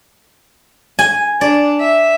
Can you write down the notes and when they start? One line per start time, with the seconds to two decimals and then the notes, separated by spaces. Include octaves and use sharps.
0.99 G#5
1.41 D4 D5
1.80 E5